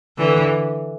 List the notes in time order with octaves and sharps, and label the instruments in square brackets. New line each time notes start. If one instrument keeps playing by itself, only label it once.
[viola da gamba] D3 E3